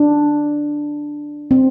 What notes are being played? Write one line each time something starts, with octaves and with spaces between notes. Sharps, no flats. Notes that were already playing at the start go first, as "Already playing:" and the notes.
Already playing: D4
C4